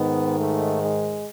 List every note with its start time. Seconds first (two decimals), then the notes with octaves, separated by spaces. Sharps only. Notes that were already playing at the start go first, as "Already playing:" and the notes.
Already playing: G#2 D#3 B3
0.39 A3
0.82 G#3